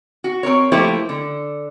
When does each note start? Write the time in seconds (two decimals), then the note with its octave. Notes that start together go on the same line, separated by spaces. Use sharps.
0.24 F#4
0.43 C4 A#4 C#5
0.72 F3 A3 A#3 E4 G4 C5
1.09 D3